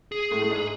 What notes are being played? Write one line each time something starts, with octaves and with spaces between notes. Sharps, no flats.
G#4
A2 A3
A3
G#2 G#3